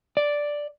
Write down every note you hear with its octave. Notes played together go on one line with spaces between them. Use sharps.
D5